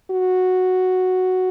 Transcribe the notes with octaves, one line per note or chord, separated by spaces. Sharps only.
F#4